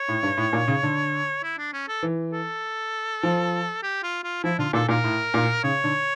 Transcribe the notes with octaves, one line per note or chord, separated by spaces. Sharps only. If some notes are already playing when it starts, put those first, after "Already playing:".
Already playing: C#5
A2
G2
A2
A#2
C#3
D3
E4
D4
C#4
A4
E3
A4
F3
G4
F4
F4
F3 E4
D3 F4
A#2 A4
A#2 A#4
A2
A#2
C#3 C#5
D3